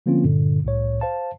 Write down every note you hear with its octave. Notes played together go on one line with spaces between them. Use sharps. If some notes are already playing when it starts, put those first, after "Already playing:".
D3 F3 A#3 C4 C#4 F4
G2 A#2 D3
C2 A2 C#5
C5 F5 A5